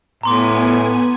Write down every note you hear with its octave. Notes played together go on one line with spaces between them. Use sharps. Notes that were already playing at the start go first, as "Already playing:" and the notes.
A2 B3 G#5 A#5 C6 D6